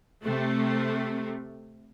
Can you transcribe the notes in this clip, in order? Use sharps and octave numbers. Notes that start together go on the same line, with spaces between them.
C3 A3